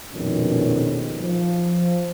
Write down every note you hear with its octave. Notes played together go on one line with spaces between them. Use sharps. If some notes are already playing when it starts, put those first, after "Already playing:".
A#1 F2 B2 D#3 G#3 C#4
F3